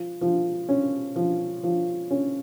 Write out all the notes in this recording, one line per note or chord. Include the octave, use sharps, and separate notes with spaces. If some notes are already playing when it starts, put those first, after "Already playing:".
Already playing: F3
F3
C#4
F3
F3
C#4